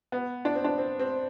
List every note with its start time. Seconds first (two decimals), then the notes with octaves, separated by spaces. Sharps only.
0.12 B3
0.45 D4
0.55 C4
0.64 D4
0.78 C4
0.99 C4